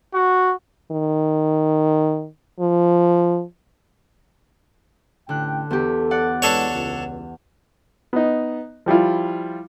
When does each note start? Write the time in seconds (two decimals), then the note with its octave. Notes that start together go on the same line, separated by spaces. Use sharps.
0.14 F#4
0.91 D#3
2.60 F3
5.29 A1 D3 G5 F#6
5.71 E2 G4 A4
6.11 D5 F#5
6.42 E3 G#3 B3 D4 A4 C#5
6.71 C#2
8.13 B3 D#4
8.86 F3 G3 E4 F4